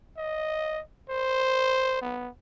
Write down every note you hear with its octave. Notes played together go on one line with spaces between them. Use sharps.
D#5
C5
B3